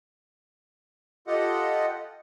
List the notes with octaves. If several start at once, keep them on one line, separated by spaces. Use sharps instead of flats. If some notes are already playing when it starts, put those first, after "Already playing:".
F4 G4 A4 D#5 F#5